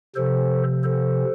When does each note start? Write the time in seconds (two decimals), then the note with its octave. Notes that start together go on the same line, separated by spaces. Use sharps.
0.15 C3 F3 A4 C5
0.83 A4 C5